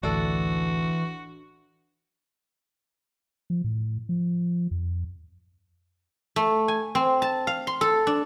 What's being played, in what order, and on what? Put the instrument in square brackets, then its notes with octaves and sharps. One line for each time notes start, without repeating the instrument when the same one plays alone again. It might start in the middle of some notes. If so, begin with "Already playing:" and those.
[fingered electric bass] A1 D2 [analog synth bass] E3 [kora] D4 A4 [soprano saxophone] F#4
[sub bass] F3
A2
F3
F2
[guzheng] A3
G#5
C4
A5
F5
C6
A4
D4